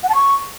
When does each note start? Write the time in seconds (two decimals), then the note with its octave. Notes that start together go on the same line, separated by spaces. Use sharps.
0.03 F#5
0.09 A5
0.15 C#6